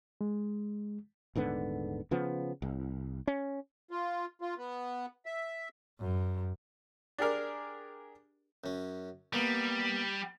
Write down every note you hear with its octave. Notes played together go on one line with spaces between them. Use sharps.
G#3
D#1 G#2 D3 B3
C#3 F3 B3
C2
C#4
F4
F4
B3
E5
F#2
D4 G4 G#4 A#4 D5
F#2 C#4
G3 A#3 B3